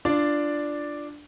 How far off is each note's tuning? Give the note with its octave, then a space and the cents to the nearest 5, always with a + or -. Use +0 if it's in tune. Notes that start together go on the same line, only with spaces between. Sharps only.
D4 +0 F4 -20 D5 +0